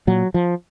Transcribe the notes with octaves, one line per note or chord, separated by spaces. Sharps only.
A#2 F#3
F3